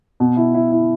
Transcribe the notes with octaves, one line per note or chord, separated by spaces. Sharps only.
B2
E4
E4
E4